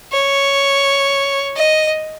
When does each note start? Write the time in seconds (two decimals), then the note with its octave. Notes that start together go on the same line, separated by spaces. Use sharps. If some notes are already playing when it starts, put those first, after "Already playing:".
0.12 C#5
1.57 D#5